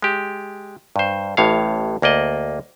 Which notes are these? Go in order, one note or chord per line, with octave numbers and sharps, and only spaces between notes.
G#3 G4
G2 C5
A1 A2 C#5 F5
D2 A#3 D5 D#5